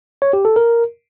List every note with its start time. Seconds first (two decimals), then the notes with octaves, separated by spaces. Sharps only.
0.22 C#5
0.33 G4
0.45 A4
0.56 A#4